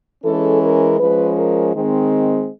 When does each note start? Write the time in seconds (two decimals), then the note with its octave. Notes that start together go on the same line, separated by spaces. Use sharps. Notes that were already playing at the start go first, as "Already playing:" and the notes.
0.24 E3 G#3 C#4 A4
0.61 A#4
0.98 F3 G#3 C#4 B4
1.36 A#4
1.73 D#3 G#3 C4